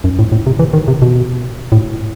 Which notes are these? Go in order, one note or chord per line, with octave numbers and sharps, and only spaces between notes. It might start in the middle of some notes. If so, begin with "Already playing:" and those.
F#2
A2
A2
C3
E3
D#3
C3
B2
A2